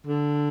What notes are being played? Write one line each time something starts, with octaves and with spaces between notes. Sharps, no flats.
D3